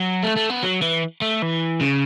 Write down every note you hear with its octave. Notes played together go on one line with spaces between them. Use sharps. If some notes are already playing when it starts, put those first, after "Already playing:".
Already playing: F#3
A3
A3
B3
F#3
E3
A3
E3
C#3